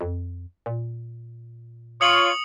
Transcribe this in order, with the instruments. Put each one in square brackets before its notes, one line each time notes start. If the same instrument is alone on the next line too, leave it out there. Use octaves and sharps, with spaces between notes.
[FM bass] F2
A#2
[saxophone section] F4 C#5 [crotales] D#6 C#7 F#7